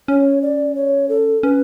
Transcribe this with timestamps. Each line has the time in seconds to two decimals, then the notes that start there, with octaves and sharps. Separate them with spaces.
0.08 C#4 C#5
0.42 D5
0.75 C#5
1.09 A4
1.43 C#4 B4